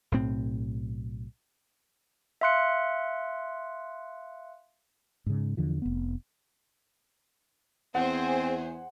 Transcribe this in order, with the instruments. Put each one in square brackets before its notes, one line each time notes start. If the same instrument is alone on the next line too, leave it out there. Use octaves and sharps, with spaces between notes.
[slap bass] B1 A2 C4
[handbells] E5 F5 C6 F#6 C#7
[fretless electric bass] G#2 C#3
E2 D3 F3
F1 B3
[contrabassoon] E2 [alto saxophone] C4 [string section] G#4 C5 [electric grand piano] F#5